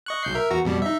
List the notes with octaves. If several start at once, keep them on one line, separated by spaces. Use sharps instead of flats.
D#5 C#6 F#6
B1 G6 C7
A#4 E5
E2 F#4 A#5
F2 B2 G3
D#4 E5